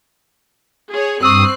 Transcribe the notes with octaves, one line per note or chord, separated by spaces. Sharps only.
G#4 C#5
G2 C4 C#6 D#6 E6 F#6 C7